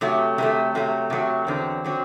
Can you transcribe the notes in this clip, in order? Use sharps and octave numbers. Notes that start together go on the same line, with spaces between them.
C3 F#3 A3
C3 F#3 A3
C3 F#3 A3
C3 F#3 A3
E2 D3 F#3 C4
D3 F#3 C4